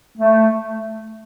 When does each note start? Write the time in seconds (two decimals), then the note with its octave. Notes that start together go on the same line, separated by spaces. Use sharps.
0.17 A3